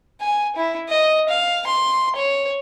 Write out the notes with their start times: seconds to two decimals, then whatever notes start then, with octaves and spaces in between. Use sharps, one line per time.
0.21 G#5
0.56 E4
0.89 D#5
1.29 F5
1.67 C6
2.16 C#5